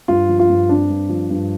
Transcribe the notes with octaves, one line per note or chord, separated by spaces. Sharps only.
G2 F4
F3
F4
G2
C4 D4
G2
F3
G2